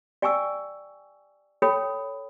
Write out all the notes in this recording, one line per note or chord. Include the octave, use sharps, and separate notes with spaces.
D5 G5 G#5 C#6 E6
A4 C#5 G5 B5